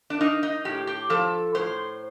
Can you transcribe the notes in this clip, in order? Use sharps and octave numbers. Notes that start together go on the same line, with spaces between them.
D4
A#3 D#4
D#4
A2 G4
G4
F3 A4
A2 C5